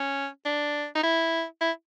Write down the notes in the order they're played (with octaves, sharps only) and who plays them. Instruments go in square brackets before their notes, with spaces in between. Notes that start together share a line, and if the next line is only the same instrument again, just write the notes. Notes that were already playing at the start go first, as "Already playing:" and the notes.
Already playing: [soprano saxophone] C#4
D4
D#4
E4
E4